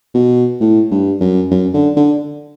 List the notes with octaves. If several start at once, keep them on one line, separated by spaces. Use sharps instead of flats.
B2
A2
G2
F#2
F#2
D3
D3